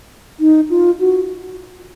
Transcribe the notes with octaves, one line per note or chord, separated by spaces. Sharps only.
D#4
F4
F#4